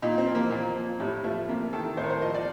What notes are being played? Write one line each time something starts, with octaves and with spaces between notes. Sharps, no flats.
A#2 D#4
C4
F3
A#3
A#2
F3
A2 G3
F3 A3
C3 A#3
D#3 A4
A2 C5
A#4
C5
F3 D#5
D5